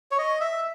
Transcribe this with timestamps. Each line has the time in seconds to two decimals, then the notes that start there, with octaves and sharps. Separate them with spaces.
0.11 C#5
0.18 D#5
0.41 E5